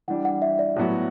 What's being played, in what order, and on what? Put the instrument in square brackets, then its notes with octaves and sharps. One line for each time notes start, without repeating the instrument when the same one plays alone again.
[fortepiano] E3 G3 D4 [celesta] F#5
[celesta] F#5
E5
D5
[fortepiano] A2 F#3 B3 F#4